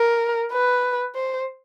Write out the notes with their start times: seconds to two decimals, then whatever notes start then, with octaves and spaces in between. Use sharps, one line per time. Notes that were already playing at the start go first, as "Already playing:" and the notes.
Already playing: A#4
0.52 B4
1.15 C5